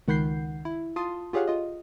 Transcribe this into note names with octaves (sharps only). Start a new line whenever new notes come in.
C#2 D#3 F#5 B5 G6 C7
E4
F4 A5 C6 D#6
F4 G4 G#4 C#5 F5 F#5
F4 D#5